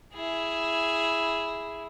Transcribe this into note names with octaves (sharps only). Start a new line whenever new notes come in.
E4 G#4